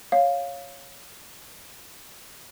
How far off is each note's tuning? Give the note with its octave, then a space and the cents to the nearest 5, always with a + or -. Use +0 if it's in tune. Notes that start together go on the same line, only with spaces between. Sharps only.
C#5 +0 F5 +5